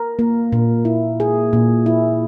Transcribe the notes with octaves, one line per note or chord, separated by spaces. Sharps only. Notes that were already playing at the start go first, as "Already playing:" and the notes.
Already playing: A#4
A#3
A#2
E4
G#4
A#2
E4